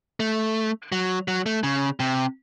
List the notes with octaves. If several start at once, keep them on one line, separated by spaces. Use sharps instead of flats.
A3
F#3
F#3
A3
C#3
C3